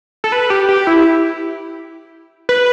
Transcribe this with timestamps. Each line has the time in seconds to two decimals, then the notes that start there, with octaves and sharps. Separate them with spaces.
0.24 A4
0.32 B4
0.50 G4
0.69 G4
0.87 E4
2.49 B4